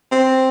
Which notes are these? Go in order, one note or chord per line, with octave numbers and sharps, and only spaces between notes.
C4